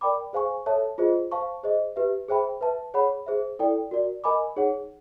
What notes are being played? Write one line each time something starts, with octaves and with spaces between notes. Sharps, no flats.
A#4 D5 G5 B5 D6
G#4 C5 F5 G#5 C#6
A4 C#5 E5 A5
F4 G#4 C5 D#5
C5 F5 A5 C#6
G#4 C5 D#5
G4 B4 E5
G#4 C5 E5 G5 B5
B4 E5 A5
G#4 C#5 F#5 B5
G#4 C5 E5
E4 A4 D5 G5
F#4 A#4 D5
A#4 D#5 G#5 B5 D6
D#4 G#4 C#5 F#5